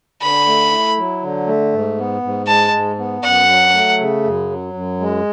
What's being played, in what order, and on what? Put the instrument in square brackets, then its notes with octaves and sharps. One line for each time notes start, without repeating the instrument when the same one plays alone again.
[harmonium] D3 [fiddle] B5
[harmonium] A3
E4
F#3
D3
A3
G#2
B3
G#2
[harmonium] G#3 [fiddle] A5
[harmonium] G#2
B3
[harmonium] F#2 [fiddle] F#5
[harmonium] F#3
A3
C#3
F#2
F#3
F#2
G#3